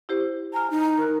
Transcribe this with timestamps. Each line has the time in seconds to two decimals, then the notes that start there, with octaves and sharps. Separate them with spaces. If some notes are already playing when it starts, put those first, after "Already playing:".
0.09 E4 G4 C5
0.54 G#5 A#5 F6
0.71 D#4
0.98 A#4 F6 F#6